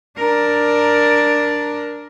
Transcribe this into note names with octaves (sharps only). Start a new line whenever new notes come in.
D4 A#4